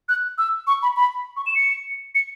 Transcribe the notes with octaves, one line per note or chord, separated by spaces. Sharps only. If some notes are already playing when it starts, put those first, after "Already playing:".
F#6
E6
C#6
B5
B5
C#6
E7
C#7
C#7